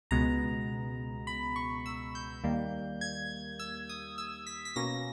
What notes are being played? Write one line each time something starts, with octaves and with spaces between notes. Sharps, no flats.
C#2 B2 G#3 B3 A#5
B5
C#6
E6
G6
D#2 D#3 G3 A#3
G#6
E6
D#6
E6
B6
B6
B2 A#3 C#4 A#6